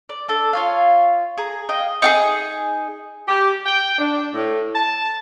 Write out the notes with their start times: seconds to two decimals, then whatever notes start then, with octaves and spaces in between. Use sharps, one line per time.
0.09 D5
0.28 D4 A4
0.53 F4 C#5 F5
1.38 G#4 A#5
1.69 D#5 F5 G5
2.02 D#4 F#4 G#4
3.28 G4
3.66 G5
3.99 D4
4.34 A2
4.74 A5